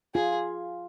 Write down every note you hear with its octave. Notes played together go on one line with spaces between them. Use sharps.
F4 G#4